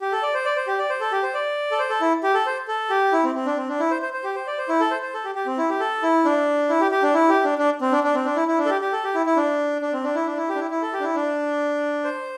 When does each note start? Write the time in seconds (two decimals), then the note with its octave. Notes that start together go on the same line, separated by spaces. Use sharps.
0.01 G4
0.12 A4
0.23 D5
0.34 C5
0.45 D5
0.56 C5
0.67 G4
0.79 D5
0.90 C5
1.01 A4
1.12 G4
1.23 C5
1.34 D5
1.71 A4
1.79 C5
1.90 A4
2.01 E4
2.23 G4
2.35 A4
2.46 C5
2.68 A4
2.90 G4
3.13 E4
3.24 C4
3.35 C4
3.46 D4
3.57 C4
3.69 D4
3.80 E4
3.91 C5
4.02 C5
4.13 C5
4.24 G4
4.35 C5
4.47 D5
4.58 C5
4.69 E4
4.80 A4
4.91 C5
5.02 C5
5.14 A4
5.25 G4
5.35 G4
5.46 C4
5.58 E4
5.69 G4
5.80 A4
6.03 E4
6.25 D4
6.69 E4
6.81 G4
6.91 G4
7.03 D4
7.14 E4
7.29 G4
7.44 D4
7.58 D4
7.81 C4
7.92 D4
8.04 D4
8.15 C4
8.25 D4
8.36 E4
8.48 E4
8.58 D4
8.65 A4
8.70 G4
8.81 G4
8.93 A4
9.04 G4
9.15 E4
9.26 E4
9.37 D4
9.82 D4
9.93 C4
10.04 D4
10.15 E4
10.26 D4
10.37 E4
10.49 G4
10.55 D4
10.60 E4
10.71 E4
10.82 A4
10.93 G4
11.00 D4
11.04 E4
11.15 D4
12.04 C5